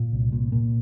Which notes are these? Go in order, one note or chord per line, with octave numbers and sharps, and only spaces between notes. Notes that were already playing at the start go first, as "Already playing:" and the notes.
Already playing: A#2
C2
A#2
A#2